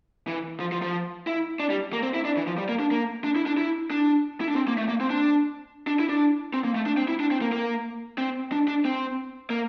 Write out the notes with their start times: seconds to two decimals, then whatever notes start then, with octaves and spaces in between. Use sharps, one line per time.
0.27 E3
0.60 F3
0.72 F3
0.82 F3
1.27 E4
1.60 D4
1.70 G3
1.93 A#3
2.03 C4
2.14 E4
2.25 D4
2.37 E3
2.47 F3
2.58 G3
2.69 A#3
2.80 D4
2.91 A#3
3.24 D4
3.36 E4
3.46 D4
3.57 E4
3.90 D4
4.41 E4
4.48 D4
4.56 C4
4.68 A#3
4.78 A3
4.89 A#3
5.01 C4
5.10 D4
5.87 D4
5.99 E4
6.09 D4
6.54 C4
6.65 A#3
6.75 A3
6.86 D4
6.97 C4
7.08 E4
7.20 D4
7.31 C4
7.41 A#3
7.52 A#3
8.18 C4
8.52 D4
8.68 D4
8.85 C4
9.50 A#3